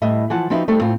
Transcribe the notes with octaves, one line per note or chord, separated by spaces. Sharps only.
A2 G3 D#5 E5
E3 F3 F#5 A5
F3 C4 D#4 F#4 B4 E5
G3 A3 C4 D#4 A4
A2 C4 F4